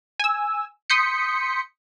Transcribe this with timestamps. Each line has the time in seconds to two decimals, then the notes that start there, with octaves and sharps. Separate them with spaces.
0.20 G#5 E6
0.90 C6 D#6 G6 B6 C#7